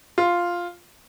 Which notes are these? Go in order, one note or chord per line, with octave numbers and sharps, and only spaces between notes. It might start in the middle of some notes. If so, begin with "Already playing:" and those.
F4